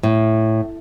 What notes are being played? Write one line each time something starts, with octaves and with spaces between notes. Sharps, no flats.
A2